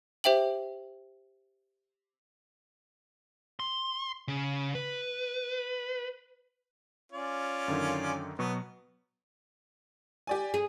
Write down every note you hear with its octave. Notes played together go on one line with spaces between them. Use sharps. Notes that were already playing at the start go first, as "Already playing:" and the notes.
G4 C5 E5 G5 F#7
C6
C#3
B4
C#4 F4 D5
F#2 D3 D#3
B2 F#3 B3 C#6
G4 D5 G#5
G#4